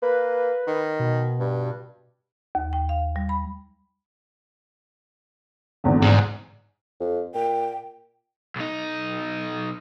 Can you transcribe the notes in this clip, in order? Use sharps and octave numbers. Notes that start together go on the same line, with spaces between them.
A#3 B4
D#3
B2
G2
D#2
G5
F5
G3
B5
G#1 E2 D3
G#2
F2
A#2 G5
B1 D#4